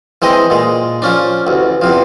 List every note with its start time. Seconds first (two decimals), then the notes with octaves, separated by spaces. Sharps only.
0.22 E3 G#3 C4 D#5
0.50 A#2 G#3
1.02 F3 C#4 D4
1.47 A1 D2
1.82 E2 C3 F3